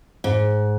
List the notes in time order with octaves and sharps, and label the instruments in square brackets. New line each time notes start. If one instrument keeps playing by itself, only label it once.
[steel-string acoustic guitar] G#2